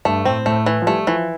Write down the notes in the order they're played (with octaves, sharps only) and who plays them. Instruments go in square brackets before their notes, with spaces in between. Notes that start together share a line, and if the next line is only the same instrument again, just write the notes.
[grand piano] G2 [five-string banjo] A3
[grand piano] A2 [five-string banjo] C4
[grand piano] A2 [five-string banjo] A3
[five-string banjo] E3
[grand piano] F3
[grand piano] G3 [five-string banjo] A3
[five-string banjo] E3 [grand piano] F3